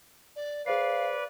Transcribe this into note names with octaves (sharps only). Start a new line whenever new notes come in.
D5
G#4 B4 C5 D5 F5 C7